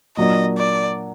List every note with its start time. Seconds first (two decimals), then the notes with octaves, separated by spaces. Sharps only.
0.17 A#2 F#3 A#3 D4 D#5
0.57 D5